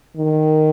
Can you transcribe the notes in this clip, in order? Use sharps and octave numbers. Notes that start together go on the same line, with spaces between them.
D#3